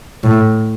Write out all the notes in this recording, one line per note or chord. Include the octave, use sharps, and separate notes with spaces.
A2